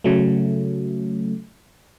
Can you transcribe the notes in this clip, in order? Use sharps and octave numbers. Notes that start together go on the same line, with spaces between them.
C#3 F#3 A3